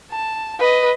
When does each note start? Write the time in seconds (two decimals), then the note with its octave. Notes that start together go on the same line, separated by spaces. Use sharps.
0.11 A5
0.59 B4 D#5